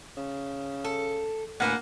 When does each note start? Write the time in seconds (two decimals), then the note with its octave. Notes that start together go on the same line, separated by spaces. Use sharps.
0.17 C#3
0.84 A4
1.60 D2 A2 A#3 B4 F#5 G#5